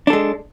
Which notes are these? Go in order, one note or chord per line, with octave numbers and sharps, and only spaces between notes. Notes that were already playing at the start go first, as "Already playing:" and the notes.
G#3 D4 A4